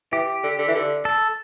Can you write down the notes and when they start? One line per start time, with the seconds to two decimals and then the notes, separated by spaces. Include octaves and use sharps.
0.12 E3 G4
0.43 D3
0.58 D3
0.68 E3
0.75 D3
1.05 A4